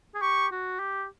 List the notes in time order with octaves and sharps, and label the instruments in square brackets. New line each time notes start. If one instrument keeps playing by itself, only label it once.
[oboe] G#4
[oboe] G4 [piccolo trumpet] C#6
[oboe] F#4
G4